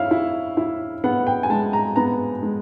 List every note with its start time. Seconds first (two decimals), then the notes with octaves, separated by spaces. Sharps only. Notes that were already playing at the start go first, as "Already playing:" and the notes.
Already playing: E4 C#5 E5 F5
0.11 E4
0.57 E4
1.04 B3 F#5
1.27 G5
1.43 G#5
1.50 G#3 A5
1.73 A#5
1.96 B3 A#5
2.43 G#3